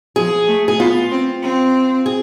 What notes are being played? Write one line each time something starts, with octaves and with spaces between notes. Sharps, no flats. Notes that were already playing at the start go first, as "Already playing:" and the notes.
F3 G#4
A3
G#4
B3 F4
C4
C4
G#4